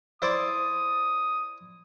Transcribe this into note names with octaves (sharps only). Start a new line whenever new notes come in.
E4 C5 D5 D#6